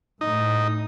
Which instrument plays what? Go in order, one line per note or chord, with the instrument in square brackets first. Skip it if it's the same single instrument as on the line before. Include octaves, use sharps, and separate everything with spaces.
[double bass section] A2 [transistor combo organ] D#4